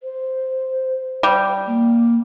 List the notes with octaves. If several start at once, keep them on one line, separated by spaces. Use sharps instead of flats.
C5
G3
A#3